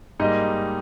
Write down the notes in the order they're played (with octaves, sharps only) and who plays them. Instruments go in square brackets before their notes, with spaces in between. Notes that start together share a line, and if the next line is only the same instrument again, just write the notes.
[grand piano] G#2 G3 A#3 D#4 D#5